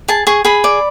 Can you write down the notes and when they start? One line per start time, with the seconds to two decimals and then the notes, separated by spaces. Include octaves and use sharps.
0.08 G#4 A5
0.27 G#4 C#6
0.45 G#4 B5
0.64 D5